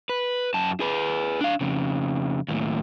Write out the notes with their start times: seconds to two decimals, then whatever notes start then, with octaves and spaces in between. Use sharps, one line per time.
0.09 B4
0.54 F#2 A5
0.80 G#4 B4
1.41 D4 F5
1.61 F2 C#3
2.48 D#2 A2